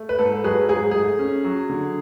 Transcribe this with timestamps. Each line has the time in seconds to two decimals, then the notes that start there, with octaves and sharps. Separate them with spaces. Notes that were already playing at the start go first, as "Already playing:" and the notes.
Already playing: A3
0.09 B4
0.19 G#2 A4
0.44 F#3 G#4 B4
0.69 G#2 G#4
0.91 A3 G#4
1.19 C#4
1.45 F#3
1.70 D3